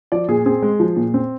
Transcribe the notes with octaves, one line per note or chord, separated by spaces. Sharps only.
F3 D5
A#2 G#4
C4 G#4
G#3
F3
A#2
C4